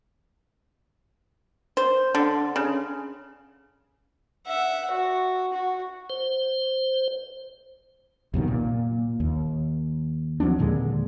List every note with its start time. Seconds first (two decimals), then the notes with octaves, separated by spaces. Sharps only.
1.77 C5
2.15 D3
2.56 C#3
4.47 E5 F#5
4.91 F#4
5.53 F#4
6.10 C5
8.34 C2 F#2 B2 D#3
8.48 A#2
9.20 D#2
10.40 F3 F#3 C4 D4
10.59 D#2 A#2 D3 G#3